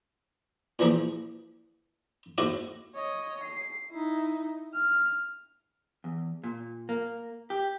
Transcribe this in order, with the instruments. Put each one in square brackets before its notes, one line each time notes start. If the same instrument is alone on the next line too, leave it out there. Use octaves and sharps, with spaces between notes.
[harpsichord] A#2 E3 F3 A#3 G#4
D#2 G#2 D#3 F#4 D6
[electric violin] C#5 D#5
C7
D#4 E4
F6
[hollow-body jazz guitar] E2
A#2
A#3
G4